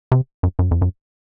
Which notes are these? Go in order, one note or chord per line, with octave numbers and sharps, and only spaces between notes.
C3
F#2
F#2
F2
F#2